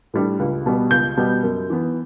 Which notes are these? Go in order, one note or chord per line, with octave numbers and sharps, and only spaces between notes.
A2 G3 D4
C#2
B2 G3 B3
C#2 G6
B2 G3 B3
F#2
E3 B3